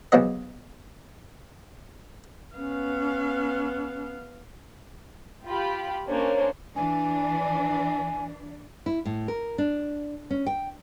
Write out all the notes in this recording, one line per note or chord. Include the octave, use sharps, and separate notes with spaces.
B1 E2 F3 F#3 B3 D#5
B3 C#4 F5
F4 G4 B5
A#3 C#4 D4 C5 C#5
E3 D4 G#5
E4
A2
A#4
D4
C#4
G5